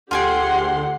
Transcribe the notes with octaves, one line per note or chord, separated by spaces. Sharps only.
D2 D3 F4 G4 G#4 F#5 G5 C6